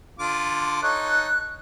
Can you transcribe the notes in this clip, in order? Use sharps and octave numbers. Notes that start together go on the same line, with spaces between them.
D3 F4 D6
D#4 A4 C#5 F#6